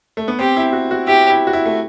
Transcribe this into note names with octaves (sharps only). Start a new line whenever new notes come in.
A3
B3
C4 G4
E4
F#4
F#4
E4 G4
E4
F#4
E4
A3